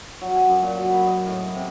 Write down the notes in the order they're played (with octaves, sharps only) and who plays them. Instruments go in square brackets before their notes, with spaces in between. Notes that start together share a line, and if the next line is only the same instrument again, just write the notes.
[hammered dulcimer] F#3
G#5
F#2
A#2
F#3
B5
D#5
A2
G#4
C3